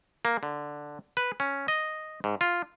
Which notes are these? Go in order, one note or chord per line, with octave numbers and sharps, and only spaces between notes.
A#3
D3
B4
C#4
D#5
G#2
F4